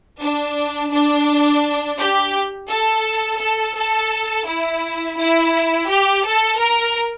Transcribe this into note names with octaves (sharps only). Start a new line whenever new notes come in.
D4
D4
G4
A4
A4
A4
E4
E4
G4
A4
A#4